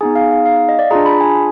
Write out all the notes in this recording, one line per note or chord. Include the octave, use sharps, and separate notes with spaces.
B3 D#4 G#4 G#5
F5
F5
F5
F5
D#5
D5
D4 F4 G#4 A#5
B5
G#5